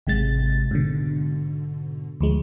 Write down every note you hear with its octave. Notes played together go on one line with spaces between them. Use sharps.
G#1 C3 G#3 A6
G#2 B2 D3
D2 F3 G#3